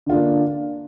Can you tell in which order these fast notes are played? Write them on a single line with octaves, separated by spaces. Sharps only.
D3 F4 D4 A#3